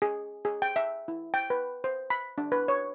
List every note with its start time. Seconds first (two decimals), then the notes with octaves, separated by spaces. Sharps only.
0.02 G#4
0.45 G#4
0.62 G5
0.76 E5
1.08 E4
1.34 G5
1.50 B4
1.84 C5
2.10 B5
2.38 D4
2.52 B4
2.68 C#5